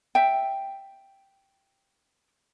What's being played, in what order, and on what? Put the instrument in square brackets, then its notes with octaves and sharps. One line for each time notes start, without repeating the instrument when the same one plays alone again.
[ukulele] E5 G5